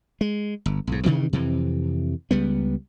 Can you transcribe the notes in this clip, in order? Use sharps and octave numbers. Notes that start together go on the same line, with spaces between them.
G#3
G1
B1 G#2
G2 C3 D#3 E3
F2 C3 E3
C#2 G3 B3